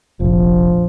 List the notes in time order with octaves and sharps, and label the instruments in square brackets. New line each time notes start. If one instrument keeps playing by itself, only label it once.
[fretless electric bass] F1 A#1 [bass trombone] F3